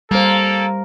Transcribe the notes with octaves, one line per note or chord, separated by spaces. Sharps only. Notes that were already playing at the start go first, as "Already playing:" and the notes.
G3 A#3 A4 C5